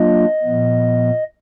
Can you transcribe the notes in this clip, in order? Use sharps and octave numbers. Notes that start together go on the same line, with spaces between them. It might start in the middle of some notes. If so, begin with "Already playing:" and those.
Already playing: F#3 A#3 D4 F4 D#5
A#2 F3 B3